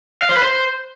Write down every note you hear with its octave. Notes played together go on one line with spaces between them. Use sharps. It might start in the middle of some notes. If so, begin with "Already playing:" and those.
F5
C5
B4
C5